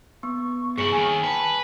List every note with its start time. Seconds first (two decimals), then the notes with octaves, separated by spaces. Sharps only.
0.23 B3 C#6
0.78 G2 E4 G#4 C#7
0.92 D#2 D#3 G#5
1.24 B4 A5